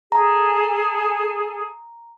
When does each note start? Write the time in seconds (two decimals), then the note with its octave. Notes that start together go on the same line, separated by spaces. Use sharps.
0.12 G#4 A4 A#5